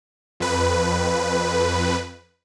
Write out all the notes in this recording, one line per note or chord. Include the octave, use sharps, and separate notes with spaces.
F2 B4